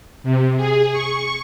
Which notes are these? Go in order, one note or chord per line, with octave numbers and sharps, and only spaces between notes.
C3
G#4
C#6